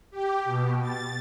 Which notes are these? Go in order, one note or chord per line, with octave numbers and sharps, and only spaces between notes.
G4
B2
A6